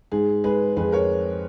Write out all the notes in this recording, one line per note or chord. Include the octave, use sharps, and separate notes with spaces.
G#2 G#4
G#3 G#4 B4
F2 G#4 B4
A#4 C#5